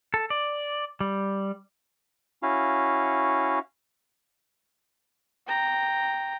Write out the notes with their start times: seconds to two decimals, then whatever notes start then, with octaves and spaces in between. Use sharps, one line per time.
0.14 A4
0.30 D5
1.00 G3
2.43 C#4 E4 F#4 F5
5.47 G5 A#5